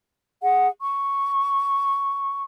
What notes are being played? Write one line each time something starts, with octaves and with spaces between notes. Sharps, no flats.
G#4 F#5
C#6